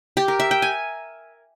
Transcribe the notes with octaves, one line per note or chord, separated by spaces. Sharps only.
G4
A#4
E5
G5
G#5